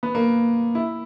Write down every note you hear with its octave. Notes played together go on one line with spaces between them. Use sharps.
B3
A#3
E4